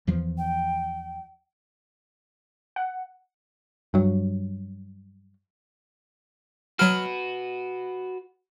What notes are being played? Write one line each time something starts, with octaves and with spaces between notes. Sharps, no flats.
E2 E3 F3
G5
F#5
G2 F#3
F#3 F#4 B4 F6